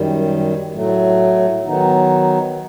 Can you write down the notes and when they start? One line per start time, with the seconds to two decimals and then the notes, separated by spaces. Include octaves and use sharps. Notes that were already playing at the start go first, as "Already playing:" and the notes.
Already playing: F#2 D#3 G3
0.73 A2 F#3 A3
1.65 D#3 F#3 B3 D#4